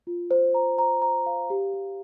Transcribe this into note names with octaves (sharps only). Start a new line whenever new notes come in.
F4
C5
A#5
A#5
A#5
F5
G4
G4